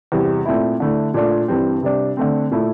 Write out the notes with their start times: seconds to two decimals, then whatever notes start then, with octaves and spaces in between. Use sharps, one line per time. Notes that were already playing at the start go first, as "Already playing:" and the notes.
0.12 E2 C3 G3
0.46 A#2 A3 C4 E4
0.80 D3 A3 E4
1.14 A#2 A3 D4 F4
1.48 G2 E3 G3 C4
1.83 C3 G3 D4
2.17 D3 A3 C4
2.51 A#2 A3 E4